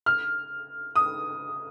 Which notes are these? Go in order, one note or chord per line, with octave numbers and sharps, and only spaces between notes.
F6
D#6